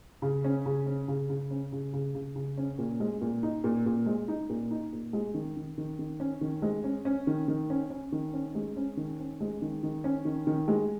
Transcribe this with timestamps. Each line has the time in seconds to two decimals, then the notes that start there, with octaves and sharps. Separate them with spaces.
0.22 C#3
0.44 C#4
0.66 C#3
0.86 C#4
1.08 C#3
1.30 C#3
1.51 C#4
1.72 C#3
1.93 C#3
2.15 C#3
2.36 C#3
2.57 C#4
2.78 A#2
3.00 G#3
3.21 A#2
3.43 D#4
3.64 A#2
3.86 A#2
4.06 G#3
4.28 D#4
4.49 A#2
4.71 D#4
4.93 A#2
5.13 G#3
5.34 D#3
5.57 D#3
5.78 D#3
5.99 D#3
6.20 C#4
6.41 D#3
6.62 G#3
6.84 C#4
7.05 C#4
7.27 D#3
7.48 D#3
7.70 C#4
7.90 C#4
8.12 D#3
8.34 C#4
8.55 G#3
8.76 C#4
8.97 D#3
9.19 C#4
9.41 G#3
9.62 D#3
9.83 D#3
10.04 C#4
10.25 D#3
10.47 D#3
10.68 G#3